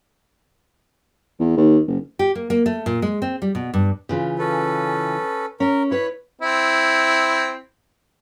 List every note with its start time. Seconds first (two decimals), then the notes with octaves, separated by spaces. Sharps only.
1.39 E2
1.57 D#2
1.88 F#1
2.19 G4
2.35 A#3
2.50 A#3
2.66 A3
2.86 A#2
3.02 G#3
3.22 C4
3.42 G3
3.55 B2
3.74 G2
4.09 C#3 E3 F4
4.39 C#4 A4 B4
5.60 C#4 A#4
5.91 E4 B4 C#5 B5
6.42 C4 E4